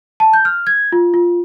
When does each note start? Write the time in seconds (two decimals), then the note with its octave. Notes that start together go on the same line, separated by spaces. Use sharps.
0.20 A5
0.33 G6
0.45 F6
0.67 G#6
0.92 F4
1.14 F4